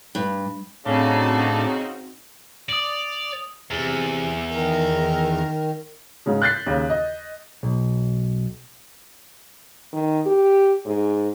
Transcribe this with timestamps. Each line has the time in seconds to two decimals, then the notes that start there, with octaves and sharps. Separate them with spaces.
0.15 G2
0.86 A2 C#3 C4 D4 D#4 F#4 A5
2.69 D5 D#6 F#7
3.70 E2 C3
4.50 D#3 A#4
6.26 G#2 C#3 G#3
6.42 F#6 G6 A6 B6 C7
6.66 D#2 C#3
6.90 D#5
7.63 B1
9.93 D#3
10.26 G4
10.86 G#2